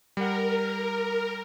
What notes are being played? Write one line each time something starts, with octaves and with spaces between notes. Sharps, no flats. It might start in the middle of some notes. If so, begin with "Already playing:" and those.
G3 A#4 F#5